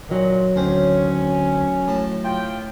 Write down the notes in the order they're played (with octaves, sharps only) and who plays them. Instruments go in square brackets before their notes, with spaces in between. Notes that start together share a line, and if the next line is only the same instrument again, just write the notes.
[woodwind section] A#2 [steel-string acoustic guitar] D#3 F#3
[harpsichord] D2 C4 [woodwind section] C#4
[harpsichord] A2 A5
[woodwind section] F4 G5